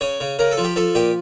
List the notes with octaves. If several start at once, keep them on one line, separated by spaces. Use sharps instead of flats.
C#3 C#5
C#3
C#3 A#4
A4
F3
G4
F3 A4
A#2 G4